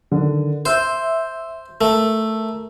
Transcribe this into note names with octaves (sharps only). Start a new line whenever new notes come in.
D3 D#3
C5 E5 E6 G6
A3 A#4